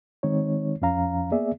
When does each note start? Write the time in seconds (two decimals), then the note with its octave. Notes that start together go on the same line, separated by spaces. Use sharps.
0.23 D#3 G#3 C4 D#4 C#5
0.82 F2 F3 C#4 F5 A#5
1.31 A#3 B3 G#4 D5 E5